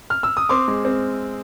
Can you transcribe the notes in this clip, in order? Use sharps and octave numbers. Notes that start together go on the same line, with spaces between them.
F6
E6
D#6
C4 C6 D6
G#3
C4